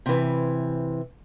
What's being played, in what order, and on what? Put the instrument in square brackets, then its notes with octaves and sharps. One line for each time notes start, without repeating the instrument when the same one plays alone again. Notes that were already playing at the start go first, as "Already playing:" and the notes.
[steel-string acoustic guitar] C3 E3